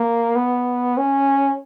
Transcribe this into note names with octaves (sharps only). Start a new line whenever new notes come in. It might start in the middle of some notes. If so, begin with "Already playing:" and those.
Already playing: A#3
B3
C#4